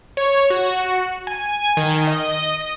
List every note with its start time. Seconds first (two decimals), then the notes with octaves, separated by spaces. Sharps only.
0.17 C#5
0.50 F#4
1.27 G#5
1.77 D#3
2.07 D#5
2.61 A#6